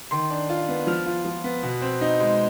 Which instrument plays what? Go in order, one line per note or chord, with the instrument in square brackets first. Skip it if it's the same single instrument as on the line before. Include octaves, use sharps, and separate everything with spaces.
[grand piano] D#3 C6
D4
F4
B3
F3 F6
F4
F3
B3
B2
C4
D#4
G#3